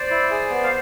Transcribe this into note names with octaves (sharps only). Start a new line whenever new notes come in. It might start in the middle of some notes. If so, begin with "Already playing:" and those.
Already playing: C5 D5
E4
G#4
B3
F5